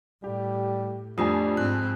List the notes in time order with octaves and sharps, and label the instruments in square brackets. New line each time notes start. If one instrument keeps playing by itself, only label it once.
[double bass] A2 [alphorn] G3 [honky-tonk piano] G4
[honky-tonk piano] F2 G#5 [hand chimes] A3 G4 D#6 [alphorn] D4
[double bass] G#2 C4 [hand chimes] F#6